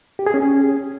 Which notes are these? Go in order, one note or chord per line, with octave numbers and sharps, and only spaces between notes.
G4
G#4
C#4